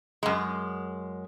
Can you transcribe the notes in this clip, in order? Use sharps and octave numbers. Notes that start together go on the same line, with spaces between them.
F#2 G#3